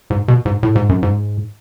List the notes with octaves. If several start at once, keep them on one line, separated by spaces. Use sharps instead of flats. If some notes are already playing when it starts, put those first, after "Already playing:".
G#2
B2
G#2
A2
G#2
F#2
G#2